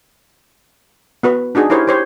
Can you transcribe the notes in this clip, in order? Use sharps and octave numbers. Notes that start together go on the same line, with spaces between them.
B3 F#4 B4
D4 D#4 F#4 G#4
E4 G4 A#4 C5 C#5
G4 C5 C#5